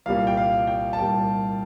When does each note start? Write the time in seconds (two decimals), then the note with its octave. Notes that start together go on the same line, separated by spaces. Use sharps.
0.06 C2 A#2 G3 A#3 F5
0.27 G5
0.37 F5
0.67 G5
0.93 A5
0.99 C2 A#2 G3 A#3 G5